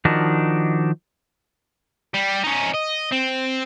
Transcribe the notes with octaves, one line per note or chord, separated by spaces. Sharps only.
D#3 F3 D4 D#4 F#4 A#4
G3
C#4 D#4
D#5
C4